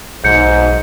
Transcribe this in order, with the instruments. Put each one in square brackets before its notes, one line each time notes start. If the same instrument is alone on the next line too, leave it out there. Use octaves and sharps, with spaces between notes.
[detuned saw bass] B1 [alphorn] G#2 [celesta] G6 C#7